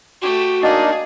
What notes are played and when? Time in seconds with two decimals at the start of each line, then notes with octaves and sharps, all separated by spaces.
0.22 A3 F#4 G4
0.63 A#3 D4 D#4 G#4 D#5 F#5 D6